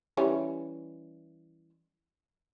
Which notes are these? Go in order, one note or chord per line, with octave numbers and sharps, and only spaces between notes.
E3 G3 C#4